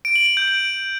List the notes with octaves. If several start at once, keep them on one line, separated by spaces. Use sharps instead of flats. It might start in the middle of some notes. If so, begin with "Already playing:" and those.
D7
F#7
F#7
G6
D7